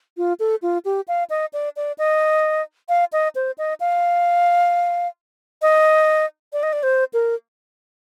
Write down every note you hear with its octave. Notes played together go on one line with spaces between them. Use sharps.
F4
A4
F4
G4
F5
D#5
D5
D5
D#5
F5
D#5
C5
D#5
F5
D#5
D5
D#5
D5
C5
A#4